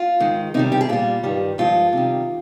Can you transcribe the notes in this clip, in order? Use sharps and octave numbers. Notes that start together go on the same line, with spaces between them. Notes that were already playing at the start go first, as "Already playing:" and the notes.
Already playing: F4
G#2 D#3 G#3
C3 D#3 G3 D#4
G4
G#4
A#2 G3 F4
G2 D#3 G3
G2 F3 G#3 F4
C3 D#3 G3